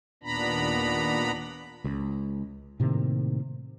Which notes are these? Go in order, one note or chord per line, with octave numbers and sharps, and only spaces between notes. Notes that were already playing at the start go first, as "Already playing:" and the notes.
D#2 A#2 B3 D4 A#5 B5
C#2
A2 C3 D#3 A#3